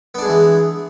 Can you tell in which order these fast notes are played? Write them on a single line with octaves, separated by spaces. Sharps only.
B3 D4 G#4 G#3 E3